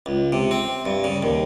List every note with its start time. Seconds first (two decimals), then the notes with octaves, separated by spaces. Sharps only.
0.06 C#2
0.32 C3
0.51 C4
0.86 G2
1.04 C#3
1.23 D#2